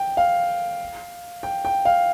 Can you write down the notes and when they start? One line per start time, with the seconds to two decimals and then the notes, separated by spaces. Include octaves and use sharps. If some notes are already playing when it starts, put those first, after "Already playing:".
Already playing: G5
0.17 F5
1.43 G5
1.65 G5
1.85 F5